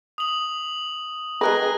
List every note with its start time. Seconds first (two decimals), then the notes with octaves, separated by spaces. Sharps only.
0.18 D#6 F#7
1.41 G#3 G#4 A#4 B4 F#6 A#6